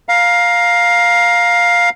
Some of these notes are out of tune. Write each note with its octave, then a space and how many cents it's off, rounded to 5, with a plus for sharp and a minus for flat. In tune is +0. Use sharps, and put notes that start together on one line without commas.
F5 +10 A#5 +15